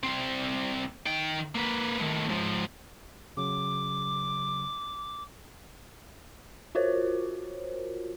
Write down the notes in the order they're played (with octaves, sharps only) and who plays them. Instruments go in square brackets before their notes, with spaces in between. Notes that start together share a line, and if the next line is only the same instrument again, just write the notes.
[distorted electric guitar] C2 C4
D#3 G5
A#3 B4
A2 D#3
G#2 F3
[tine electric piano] C#3 F#3 [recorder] D6
[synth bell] F4 F#4 A#4 C5 C#5